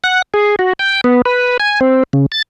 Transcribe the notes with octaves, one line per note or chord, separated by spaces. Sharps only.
F#5
G#4
F#4
G5
B3
B4
G#5
C4
C#3
A6